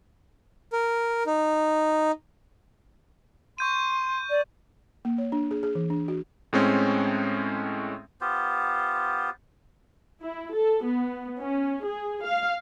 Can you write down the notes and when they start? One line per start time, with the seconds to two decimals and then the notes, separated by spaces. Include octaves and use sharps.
0.72 A#4
1.26 D#4
3.58 C6 C#6 G6 D#7
4.30 D5
5.05 A#3
5.18 C#5
5.32 D4
5.51 G#4
5.63 G#4
5.75 E3
5.90 D4
6.08 F#4
6.53 A2 G#3 C4 C#4
8.21 B3 F4 G4 C5
10.21 E4
10.52 A4
10.84 B3
11.39 C#4
11.85 G#4
12.25 F5